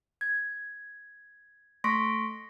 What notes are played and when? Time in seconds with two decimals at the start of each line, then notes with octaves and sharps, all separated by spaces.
0.21 G#6
1.84 A3 C6 C#6 A#6 B6 D7